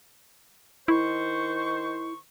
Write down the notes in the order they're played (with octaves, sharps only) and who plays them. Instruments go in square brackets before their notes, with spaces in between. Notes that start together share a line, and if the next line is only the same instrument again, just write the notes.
[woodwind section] D#3 C5 C#6 [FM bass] E4